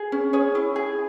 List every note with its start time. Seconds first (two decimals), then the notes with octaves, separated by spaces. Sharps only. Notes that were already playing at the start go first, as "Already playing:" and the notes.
Already playing: G#4
0.12 C#4
0.33 G#4 C#5
0.55 E4
0.76 G#4